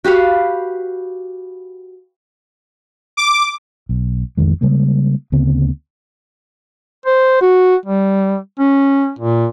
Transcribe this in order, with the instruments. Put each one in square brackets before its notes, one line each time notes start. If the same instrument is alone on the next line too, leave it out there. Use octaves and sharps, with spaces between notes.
[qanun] F#4 G4 B4 F5
[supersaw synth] D6
[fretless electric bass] B1
A1 F2 D#3 G#3
C#3 G3 G#3 A#3
D2 C#3 B3 C4
[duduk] C5
F#4
G3
C#4
A#2